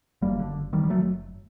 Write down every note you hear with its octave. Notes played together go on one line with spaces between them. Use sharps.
F#1 F#2 D3 G3 A#3
D3
D#3 G3
G3
F#3 A3